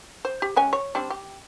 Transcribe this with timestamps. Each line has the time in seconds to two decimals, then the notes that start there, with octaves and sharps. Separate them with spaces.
0.25 C5
0.42 G4
0.56 G#3 C#4 G#5
0.73 C#5
0.95 G3 C4 D4
1.10 G4